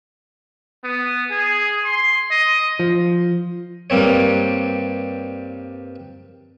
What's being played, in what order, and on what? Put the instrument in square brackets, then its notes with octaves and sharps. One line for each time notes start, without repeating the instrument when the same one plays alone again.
[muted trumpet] B3
G#4
C6
D#5
[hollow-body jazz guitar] F3
[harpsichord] G2 G3 A#3 C4 C#5